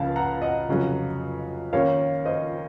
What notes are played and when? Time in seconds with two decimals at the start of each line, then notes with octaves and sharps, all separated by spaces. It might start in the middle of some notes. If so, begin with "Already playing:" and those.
Already playing: C#2 C#3 F3 A#3 F5 A5
0.16 F#5 A#5
0.42 D#5 F#5
0.68 F1 F2 C#3 F#3
1.73 D#2 D#3 A#3 C#4 C#5 F5
2.25 C5 D#5